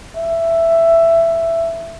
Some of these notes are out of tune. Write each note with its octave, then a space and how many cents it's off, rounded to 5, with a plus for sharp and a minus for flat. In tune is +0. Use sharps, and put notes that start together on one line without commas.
E5 +10